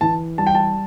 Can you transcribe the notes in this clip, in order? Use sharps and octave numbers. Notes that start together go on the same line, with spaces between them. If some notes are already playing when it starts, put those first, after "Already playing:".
E3 A5
G3 A5
G5
A5